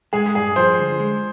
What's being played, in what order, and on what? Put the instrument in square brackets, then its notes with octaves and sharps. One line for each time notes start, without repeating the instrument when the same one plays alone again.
[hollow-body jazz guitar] G#3 [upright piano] G#4
[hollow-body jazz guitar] G2 [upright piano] G#4
[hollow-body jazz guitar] F3 [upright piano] C5
[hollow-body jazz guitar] D3
G#3